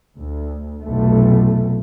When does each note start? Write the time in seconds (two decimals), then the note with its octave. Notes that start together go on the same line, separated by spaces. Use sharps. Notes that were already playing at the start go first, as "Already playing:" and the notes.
0.16 D2
0.84 F1 B1 A3